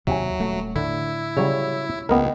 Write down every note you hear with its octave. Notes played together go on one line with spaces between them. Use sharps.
D#2 C3 F#3 E5 G5 G#5
D#1 A3
A2 D3 E4
C#3 F#3 G3 F#4 C#5
C#2 A#3 B3 A#4 D#5 G5